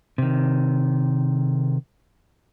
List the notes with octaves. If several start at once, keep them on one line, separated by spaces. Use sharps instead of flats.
C3 D#3